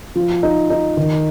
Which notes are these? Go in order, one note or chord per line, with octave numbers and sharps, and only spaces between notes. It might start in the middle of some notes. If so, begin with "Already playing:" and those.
F3
D#4
D#4
D#3